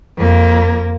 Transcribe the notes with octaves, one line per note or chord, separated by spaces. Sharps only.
F2 A#3